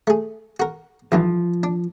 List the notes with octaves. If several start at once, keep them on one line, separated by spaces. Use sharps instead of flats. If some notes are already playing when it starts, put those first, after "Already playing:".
A3 G#4
F#4 A#4
B1 G2 E3 F3
D4